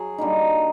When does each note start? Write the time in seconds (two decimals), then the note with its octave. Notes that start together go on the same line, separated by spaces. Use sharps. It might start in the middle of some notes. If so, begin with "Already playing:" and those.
Already playing: F#3 G#4
0.18 D3 G3 A#3 D#4